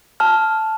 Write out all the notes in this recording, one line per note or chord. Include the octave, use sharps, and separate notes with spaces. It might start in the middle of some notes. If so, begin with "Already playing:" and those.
A5 F6